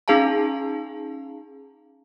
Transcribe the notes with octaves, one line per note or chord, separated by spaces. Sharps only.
C#4 D#4 G#4 F5 A5 A#5